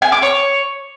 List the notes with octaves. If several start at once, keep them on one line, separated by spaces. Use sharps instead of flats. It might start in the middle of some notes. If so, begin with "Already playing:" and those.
G#5
D6
C#5